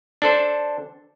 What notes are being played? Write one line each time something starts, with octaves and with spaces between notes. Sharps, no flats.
D4 A4 C5